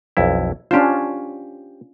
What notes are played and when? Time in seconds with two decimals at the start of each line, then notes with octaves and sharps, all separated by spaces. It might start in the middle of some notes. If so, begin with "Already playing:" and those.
0.17 B1 F2 E4
0.71 C#4 D4 F4 G4 C5